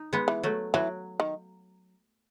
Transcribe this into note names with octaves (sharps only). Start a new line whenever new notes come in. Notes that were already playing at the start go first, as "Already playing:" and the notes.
Already playing: D#4
G#3 B3
E3
F#3 A3
E3 F#3
D#3